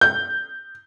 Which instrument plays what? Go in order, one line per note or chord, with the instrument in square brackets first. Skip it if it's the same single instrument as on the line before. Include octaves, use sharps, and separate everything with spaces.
[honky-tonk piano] G6